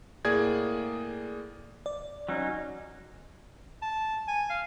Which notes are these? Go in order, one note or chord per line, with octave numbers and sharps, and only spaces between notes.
A2 A#3 G#4 D5 G#6
D5
F#3 C#4 D#4
A5
G#5
F5